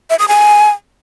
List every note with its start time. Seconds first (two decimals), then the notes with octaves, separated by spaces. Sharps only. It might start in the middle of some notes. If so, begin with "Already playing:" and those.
0.10 E5
0.19 D#6
0.28 G#5